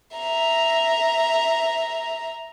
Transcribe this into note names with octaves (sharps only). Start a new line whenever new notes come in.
E5 A#5